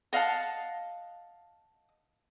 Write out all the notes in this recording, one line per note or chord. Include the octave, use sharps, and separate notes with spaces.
D#5 F5 F#5 A5